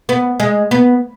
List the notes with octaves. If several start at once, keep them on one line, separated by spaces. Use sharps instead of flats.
B3
G#3
B3